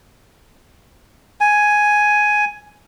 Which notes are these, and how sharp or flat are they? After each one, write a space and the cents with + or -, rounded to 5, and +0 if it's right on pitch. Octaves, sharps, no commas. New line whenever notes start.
G#5 +5